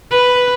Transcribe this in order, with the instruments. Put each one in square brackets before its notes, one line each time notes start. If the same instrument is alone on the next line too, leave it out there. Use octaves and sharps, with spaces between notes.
[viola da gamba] B4